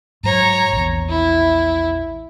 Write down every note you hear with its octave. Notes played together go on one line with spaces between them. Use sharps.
G#2 F#3 C#5 A#5
A#1 E2
E4